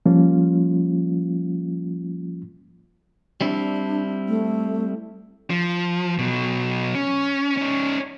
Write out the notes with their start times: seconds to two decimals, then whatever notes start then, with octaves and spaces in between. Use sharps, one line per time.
0.06 F3 G3 A#3 C#4 F4
3.41 G3 C4 D4 E4
4.28 A3
5.50 F3
6.18 B2 F#3
6.95 C#4
7.57 C#4 D#4